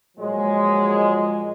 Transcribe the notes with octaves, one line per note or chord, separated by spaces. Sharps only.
A#2 F3 F#3 G#3